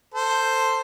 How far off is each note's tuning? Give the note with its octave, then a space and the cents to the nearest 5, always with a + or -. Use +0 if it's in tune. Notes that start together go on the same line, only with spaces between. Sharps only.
A4 +20 C5 +0